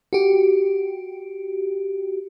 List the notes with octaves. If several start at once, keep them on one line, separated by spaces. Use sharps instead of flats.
F#4 G4